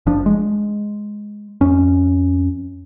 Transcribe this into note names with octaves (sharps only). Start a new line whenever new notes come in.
F#1 F3 D4
G#3
F2 C#4